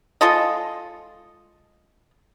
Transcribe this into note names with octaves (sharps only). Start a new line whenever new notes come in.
G#3 F4 A4 D#5